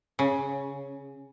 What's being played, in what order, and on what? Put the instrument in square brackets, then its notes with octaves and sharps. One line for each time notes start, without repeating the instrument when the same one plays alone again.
[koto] C#3